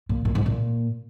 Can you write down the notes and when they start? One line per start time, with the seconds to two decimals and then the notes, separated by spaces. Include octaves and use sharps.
0.09 A#2
0.25 A#2
0.35 G#2
0.46 A#2